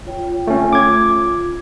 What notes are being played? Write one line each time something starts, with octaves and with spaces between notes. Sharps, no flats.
F4 C#5 G5
A3 C#4
F4 D6 G#6